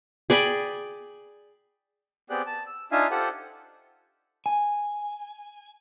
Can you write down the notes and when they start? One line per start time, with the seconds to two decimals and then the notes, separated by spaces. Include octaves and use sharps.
0.30 G#4 D5 G5 B5
2.30 B3 C4 G4 G#4 D5 F#6
2.46 A5
2.66 E6
2.92 D4 D#4 F4 E5 F5 G#5
3.11 F4 G4 A4 C5 F#5
4.46 G#5